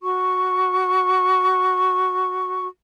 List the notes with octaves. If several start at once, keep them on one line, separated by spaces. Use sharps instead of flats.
F#4 C#6